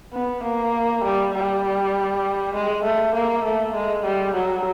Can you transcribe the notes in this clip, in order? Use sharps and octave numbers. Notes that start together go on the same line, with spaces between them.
B3
A#3
G3
G3
G#3
A3
A#3
A3
G#3
G3
F#3